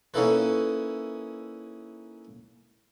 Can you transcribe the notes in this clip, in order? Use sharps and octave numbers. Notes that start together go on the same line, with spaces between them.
A#3 C#4 D#4 E4 A4 B4